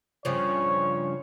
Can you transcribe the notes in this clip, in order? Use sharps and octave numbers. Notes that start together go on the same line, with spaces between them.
G2 C#3 F3 C#5